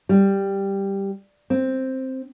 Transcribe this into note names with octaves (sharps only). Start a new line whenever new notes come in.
G3
C4